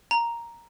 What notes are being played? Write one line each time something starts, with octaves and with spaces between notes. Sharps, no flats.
A#5